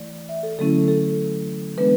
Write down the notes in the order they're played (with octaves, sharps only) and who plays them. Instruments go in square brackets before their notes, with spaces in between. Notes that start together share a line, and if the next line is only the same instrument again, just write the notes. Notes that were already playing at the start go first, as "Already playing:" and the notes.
Already playing: [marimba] E3 A3 E4 D5
E5
A4
D3 F#3 A3 C#4 E4 A4
A4
E3 G#3 B3 D4 B4